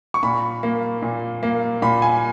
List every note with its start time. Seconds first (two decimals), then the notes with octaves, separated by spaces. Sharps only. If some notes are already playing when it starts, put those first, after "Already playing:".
0.14 C#6
0.23 A#2 B5
0.63 A#3
1.02 A#2
1.43 A#3
1.82 A#2 B5
2.02 G#5